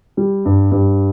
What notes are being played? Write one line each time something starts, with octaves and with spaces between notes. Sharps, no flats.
G3
G2
G2